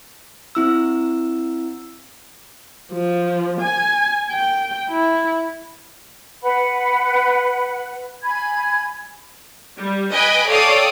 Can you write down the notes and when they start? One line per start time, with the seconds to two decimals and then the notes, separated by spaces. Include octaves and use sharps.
0.55 C4 E4 E6
2.93 F3
3.61 G#5
4.31 G5
4.90 E4
6.42 B4 F#5 B5
8.22 G#5 B5 G#6
9.78 G3
10.12 B4 D#5 G5 G#5 B5
10.47 A4 C#5 D5 F5 G5 D#6